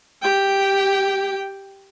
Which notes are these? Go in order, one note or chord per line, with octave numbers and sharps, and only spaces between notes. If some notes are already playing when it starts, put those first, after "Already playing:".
G4 G5